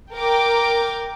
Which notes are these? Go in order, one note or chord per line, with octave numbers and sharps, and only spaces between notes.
A#4 G5 D6